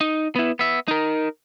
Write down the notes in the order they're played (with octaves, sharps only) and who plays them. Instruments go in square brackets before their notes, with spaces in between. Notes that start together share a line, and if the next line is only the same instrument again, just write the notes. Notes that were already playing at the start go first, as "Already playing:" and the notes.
[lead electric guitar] D#4
B3 E4
B3 E5
D#4 A#4